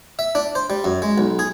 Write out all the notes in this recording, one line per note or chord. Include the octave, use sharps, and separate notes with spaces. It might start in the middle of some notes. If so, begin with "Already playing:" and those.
E5
D4
C5
G3
F#2
G#3
B1
G#4